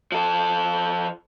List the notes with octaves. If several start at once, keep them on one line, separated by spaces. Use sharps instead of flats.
F3 A4